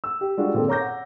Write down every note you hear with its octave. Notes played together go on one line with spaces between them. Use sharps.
E6
G4
G3 G#3 D4 F4 F#4
A#2 D#3 C4 G#4 A4
C#5 A#5 D6 G6 A#6
F#5